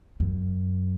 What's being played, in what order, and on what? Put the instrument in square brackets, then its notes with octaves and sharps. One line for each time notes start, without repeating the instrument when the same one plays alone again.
[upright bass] F#2